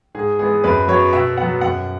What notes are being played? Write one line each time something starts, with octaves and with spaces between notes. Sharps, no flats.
G#2 G#4
E3 G#3 B3 G#4
F#2 B4
F#3 B3 C#5
B2 E5
F#3 B3 F#5
F#2 F#5